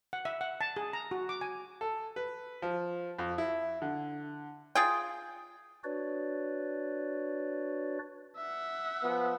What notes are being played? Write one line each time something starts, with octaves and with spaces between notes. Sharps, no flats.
F#5
E5
F#5
A5
G#4
A#5
F#4
D6
G#5
A4
B4
F3
F2
E4
D3
F4 G#4 G5
D4 F#4 B4 C#5 D5
E5 F#5
F3 B3